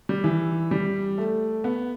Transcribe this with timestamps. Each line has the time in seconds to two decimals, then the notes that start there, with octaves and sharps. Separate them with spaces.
0.09 G3
0.24 E3
0.71 G3
1.18 A3
1.64 B3